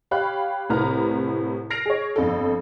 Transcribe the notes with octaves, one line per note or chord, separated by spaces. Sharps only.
G4 C#5 F5 B5 F#6
C2 A2 C3 B4 A#5 F6
F6 A#6 C7 D7 F7
G#4 C#5
G1 F2 A4